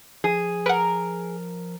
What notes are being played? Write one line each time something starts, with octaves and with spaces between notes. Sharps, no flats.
F3 G#4
A#4 B4 F#5